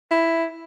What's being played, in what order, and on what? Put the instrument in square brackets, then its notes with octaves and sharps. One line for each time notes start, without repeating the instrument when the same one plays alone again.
[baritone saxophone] E4